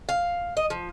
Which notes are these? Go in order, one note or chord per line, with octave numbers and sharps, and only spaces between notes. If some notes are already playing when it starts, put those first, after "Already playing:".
F5
D#5
F3